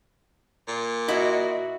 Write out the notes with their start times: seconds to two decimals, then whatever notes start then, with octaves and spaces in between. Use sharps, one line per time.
0.68 A#2
1.08 E4 F#4 D#5